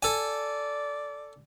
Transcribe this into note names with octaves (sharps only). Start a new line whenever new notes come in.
A4 D5 G#5